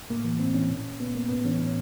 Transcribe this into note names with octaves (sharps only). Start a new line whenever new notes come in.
A2 A#3
E3
A2 C4
E3 C#4
A#2
A#2 B3
A#3
A2 B3
E3 C#4
A2 C#4